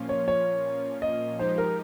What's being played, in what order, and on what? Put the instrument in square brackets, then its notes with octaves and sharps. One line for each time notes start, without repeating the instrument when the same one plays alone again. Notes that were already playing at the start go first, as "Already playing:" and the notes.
Already playing: [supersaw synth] A#2 F3 A#3 C#4 F4
[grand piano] C#5
C#5
D#5
[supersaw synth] F3 G#3 D#4 G4 [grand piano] C5
[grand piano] A#4